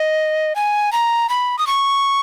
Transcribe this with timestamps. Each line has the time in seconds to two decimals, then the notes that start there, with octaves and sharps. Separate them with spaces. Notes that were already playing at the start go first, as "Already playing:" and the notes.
Already playing: D#5
0.56 G#5
0.93 A#5
1.29 B5
1.59 D#6
1.67 C#6